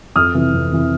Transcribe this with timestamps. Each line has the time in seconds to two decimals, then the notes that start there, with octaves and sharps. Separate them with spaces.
0.16 F2 D#6 F6
0.34 C3 E3
0.53 F2
0.72 C3 E3